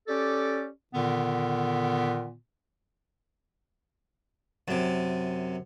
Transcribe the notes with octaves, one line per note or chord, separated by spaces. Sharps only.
C#4 G4 A4 D5
A#2 D3 D#3 B3
F#2 C3